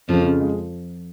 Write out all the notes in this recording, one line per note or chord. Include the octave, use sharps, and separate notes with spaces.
F2 C#3 F3
C#3
G#3